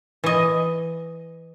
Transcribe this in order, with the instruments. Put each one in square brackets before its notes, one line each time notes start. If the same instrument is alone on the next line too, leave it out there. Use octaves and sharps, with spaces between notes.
[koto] E3 D#5